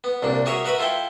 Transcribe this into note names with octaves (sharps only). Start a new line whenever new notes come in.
B3
C2 A#2 D4
F#4 G#4 A#4 C#5 E5
F#4 A#4 B4 E5 B5
E4 F4 A4 E5 G5